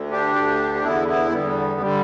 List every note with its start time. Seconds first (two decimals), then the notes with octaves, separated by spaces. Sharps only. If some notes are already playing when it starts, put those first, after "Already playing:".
Already playing: D2 D3
0.11 D4 G4
0.36 D2 D3
0.75 G4
0.83 E2 D3 B3 E4
1.08 B3 E4
1.32 E2 D3 G3 B3
1.80 D3 G3